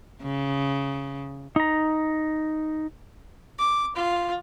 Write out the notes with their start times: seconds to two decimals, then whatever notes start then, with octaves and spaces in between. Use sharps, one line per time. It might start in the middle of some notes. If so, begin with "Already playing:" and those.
0.22 C#3
1.56 D#4 A#5
3.58 D6
3.96 F4